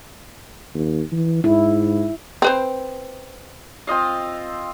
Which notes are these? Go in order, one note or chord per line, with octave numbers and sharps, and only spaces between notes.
D#2
E3
G#2 E4
C4 B4 C5
C4 F4 D#5 F5